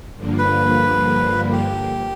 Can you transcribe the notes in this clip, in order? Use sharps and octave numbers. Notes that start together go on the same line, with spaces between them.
G2 D3 F3 A#3
B4
G4